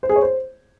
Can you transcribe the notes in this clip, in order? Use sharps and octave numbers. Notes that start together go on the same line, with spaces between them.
C5
G#4
C#5
C5